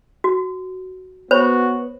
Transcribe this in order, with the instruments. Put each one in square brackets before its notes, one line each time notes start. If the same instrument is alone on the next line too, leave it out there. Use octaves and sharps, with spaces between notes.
[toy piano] F#4
[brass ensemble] B3 [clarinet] F#4 [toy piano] C5 C#5 B5